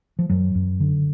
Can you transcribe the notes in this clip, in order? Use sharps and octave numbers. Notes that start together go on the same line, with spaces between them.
F3
F#2 F#3
F#2
D3